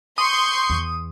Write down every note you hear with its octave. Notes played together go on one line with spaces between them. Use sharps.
C6 C#6 D#6 G6
E2